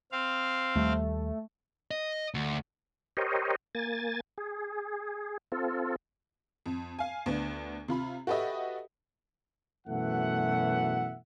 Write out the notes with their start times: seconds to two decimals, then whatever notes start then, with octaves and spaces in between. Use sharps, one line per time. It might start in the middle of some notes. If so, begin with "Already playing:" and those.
0.12 C4 F5
0.76 D#2 G3 A3
1.91 D#5
2.34 D2
3.17 G4 A#4 C5 C#5 D#5
3.75 A#3 G#5 A6
4.38 G#4
5.52 C4 F4 A4
6.66 F2
6.99 F5 G#5
7.26 D2 B3 D4
7.88 C3 F4 B5
8.27 F#4 G4 A4 B4 D#5 E5
9.87 F#2 B2 E3 A3 E5 F#5